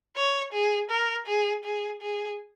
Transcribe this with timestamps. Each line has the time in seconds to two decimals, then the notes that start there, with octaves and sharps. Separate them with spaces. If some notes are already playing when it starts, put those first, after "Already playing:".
0.16 C#5
0.53 G#4
0.90 A#4
1.27 G#4
1.64 G#4
2.02 G#4